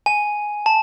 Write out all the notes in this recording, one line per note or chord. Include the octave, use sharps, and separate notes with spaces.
G#5
A5